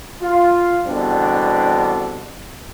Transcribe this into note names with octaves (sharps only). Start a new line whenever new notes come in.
F4
E2 B2 D3 G3 C4 D4